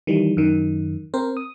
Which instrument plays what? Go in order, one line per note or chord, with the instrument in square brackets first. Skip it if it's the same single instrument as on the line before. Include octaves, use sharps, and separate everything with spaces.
[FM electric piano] D#3 E3 G3
F#2 D#3
C4 A#4 C5
D#6